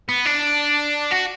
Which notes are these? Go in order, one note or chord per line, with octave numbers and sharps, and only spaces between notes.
B3
D4
F#4